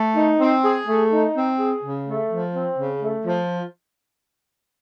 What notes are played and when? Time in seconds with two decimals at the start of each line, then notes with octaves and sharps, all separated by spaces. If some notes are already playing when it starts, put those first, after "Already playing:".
Already playing: A3
0.15 D#4
0.40 C4
0.64 G#4
0.87 A3
1.11 D#4
1.35 C4
1.58 G#4
1.82 C#3
2.06 A3
2.30 F3
2.54 C4
2.77 C#3
3.01 A3
3.25 F3